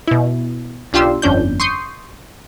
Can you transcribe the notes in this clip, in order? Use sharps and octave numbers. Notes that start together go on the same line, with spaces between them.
B2 E4
B1 D4 F4 G4 C6 E6
G1 F2 C#4 D4 G6
C6 C#6 D#6 G6 C7